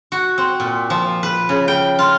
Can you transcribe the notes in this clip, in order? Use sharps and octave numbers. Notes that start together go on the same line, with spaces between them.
F#4
C4
A#2
F3
B4
C#3
G5
F4